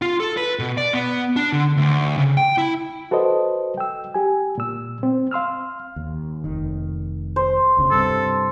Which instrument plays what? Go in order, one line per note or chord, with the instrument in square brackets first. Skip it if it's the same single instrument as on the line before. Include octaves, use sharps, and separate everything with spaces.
[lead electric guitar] F4
A4
B4
B2
D5
B3
D4
D3
D2
C#3
G5
E4
[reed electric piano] F#4 A4 B4 C5 D#5
G5 E6
G4 G#5
A#2 E6
C4
F5 C6 E6 F6
[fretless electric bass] D#2
F1 D#3
[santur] C5
[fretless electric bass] E1 D2 C#3
[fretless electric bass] G2 C3 [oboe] A4